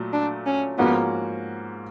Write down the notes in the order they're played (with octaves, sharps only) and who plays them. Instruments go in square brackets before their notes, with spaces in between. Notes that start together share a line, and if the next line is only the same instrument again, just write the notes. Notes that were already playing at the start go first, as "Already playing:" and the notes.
Already playing: [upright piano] A#2 F#3 A3
[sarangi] D4
C#4
[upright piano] G#2 F3 A#3 C#4 F#4 [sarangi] B3